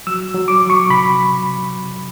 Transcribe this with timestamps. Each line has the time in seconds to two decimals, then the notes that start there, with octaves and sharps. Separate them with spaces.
0.07 F#3 E6
0.34 F#3
0.48 D6
0.62 F#3
0.70 C#6
0.89 C3 B5